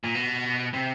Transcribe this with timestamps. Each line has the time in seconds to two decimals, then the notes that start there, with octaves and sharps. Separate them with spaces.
0.04 A#2
0.15 B2
0.74 C3